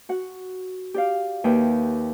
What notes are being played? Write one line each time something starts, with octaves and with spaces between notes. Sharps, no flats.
F#4 F#5
G4 D5 F5
D#2 B4 C#5 E5 G5